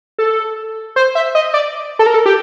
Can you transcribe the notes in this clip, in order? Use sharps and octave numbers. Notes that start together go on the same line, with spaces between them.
A4
C5
E5
D#5
D5
A4
A#4
A4
G4